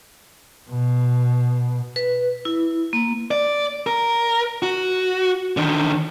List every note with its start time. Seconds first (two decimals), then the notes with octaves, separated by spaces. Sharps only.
0.71 B2
1.96 B4
2.45 E4
2.93 A#3
3.31 D5
3.87 A#4
4.62 F#4
5.57 D3 D#3